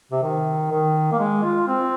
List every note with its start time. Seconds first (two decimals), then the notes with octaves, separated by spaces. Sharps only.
0.12 C3
0.23 D#3
0.71 D#3
1.12 A#3
1.19 G#3
1.43 F4
1.68 C4